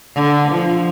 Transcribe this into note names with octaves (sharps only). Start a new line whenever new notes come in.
D3
F3